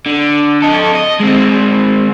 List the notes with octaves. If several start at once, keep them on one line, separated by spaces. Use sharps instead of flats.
D3
A4 D#5
D#5
G#3 C4